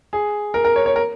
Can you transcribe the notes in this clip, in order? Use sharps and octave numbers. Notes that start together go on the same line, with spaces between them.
G#4
A#4
A#4
C#5
C#5
A#4